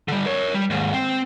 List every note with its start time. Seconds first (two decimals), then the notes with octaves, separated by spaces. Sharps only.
0.08 D3 G3
0.26 A#4 C#5
0.54 G3
0.70 D#2 G#2
0.93 C4